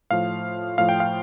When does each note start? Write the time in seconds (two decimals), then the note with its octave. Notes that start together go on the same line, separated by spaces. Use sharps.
0.11 A2 F3 F5
0.78 A2 F3 F5
0.89 G5
1.00 F5